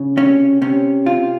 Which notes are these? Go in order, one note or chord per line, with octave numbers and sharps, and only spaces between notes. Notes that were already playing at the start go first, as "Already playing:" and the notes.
Already playing: C#3
C3 C#4
C3 C#4
C3 F4